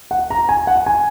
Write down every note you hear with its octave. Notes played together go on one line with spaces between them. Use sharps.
F#5
A#5
G#5
F#5
G#5